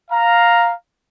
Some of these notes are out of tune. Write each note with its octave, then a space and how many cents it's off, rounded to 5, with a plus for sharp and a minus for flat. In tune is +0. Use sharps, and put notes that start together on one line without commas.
F5 +5 A#5 +0